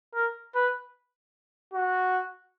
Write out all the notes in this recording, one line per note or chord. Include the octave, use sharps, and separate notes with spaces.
A#4
B4
F#4